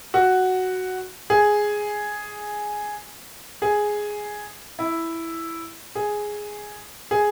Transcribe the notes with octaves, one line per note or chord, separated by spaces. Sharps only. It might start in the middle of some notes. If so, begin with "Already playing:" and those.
F#4
G#4
G#4
E4
G#4
G#4